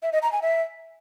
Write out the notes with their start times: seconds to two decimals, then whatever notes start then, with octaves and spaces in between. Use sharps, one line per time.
0.03 E5
0.12 D#5
0.22 A#5
0.32 G#5
0.42 E5